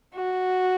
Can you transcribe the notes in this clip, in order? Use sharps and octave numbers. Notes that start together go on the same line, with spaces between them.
F#4